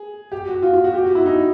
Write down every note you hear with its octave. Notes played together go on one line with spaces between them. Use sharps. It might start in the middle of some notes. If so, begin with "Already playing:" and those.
Already playing: G#4
G4
F#4
F4
F4
F#4
G4
F#4
E4
D#4